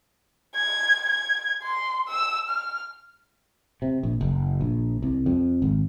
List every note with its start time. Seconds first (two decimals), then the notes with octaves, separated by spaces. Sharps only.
0.55 G#6
1.09 G#6
1.63 C6
2.08 E6
2.49 F6
3.82 C3
4.03 A#1
4.21 F#1
4.61 A#1
5.02 C2
5.26 F2
5.62 G#1